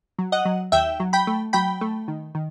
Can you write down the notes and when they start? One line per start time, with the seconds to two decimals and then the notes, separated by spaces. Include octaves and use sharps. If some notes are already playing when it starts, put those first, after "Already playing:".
0.19 F#3
0.32 D#5 F#5
0.45 F#3
0.72 D#2 E5 G5
1.00 F#3
1.13 G5 B5
1.27 A3
1.53 F#3 G5 B5
1.81 A3
2.08 D#3
2.35 D#3